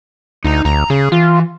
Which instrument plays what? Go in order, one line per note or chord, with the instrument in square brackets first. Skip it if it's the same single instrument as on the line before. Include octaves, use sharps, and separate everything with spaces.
[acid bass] D2 [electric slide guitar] D#4 A#5
[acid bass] D2 [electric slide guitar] A#5
[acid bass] C#3 [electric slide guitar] G#4
[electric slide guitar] E3 [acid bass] F4